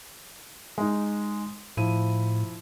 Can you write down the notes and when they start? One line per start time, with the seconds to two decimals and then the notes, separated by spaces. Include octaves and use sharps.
0.78 G#3 D#4
1.77 A2 F3 E4 D#7